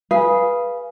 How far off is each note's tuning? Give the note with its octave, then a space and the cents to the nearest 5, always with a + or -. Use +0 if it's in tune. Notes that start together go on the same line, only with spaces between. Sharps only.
G#4 +0 B4 -15 F5 -15